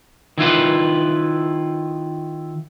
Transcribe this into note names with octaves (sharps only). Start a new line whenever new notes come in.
D#3 E4 F4 B4